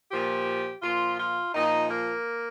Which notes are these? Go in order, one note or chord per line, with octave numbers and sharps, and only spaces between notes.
A#2 F3 G4
A#2 F3 F4
F4
A#2 F3 D#4
A#3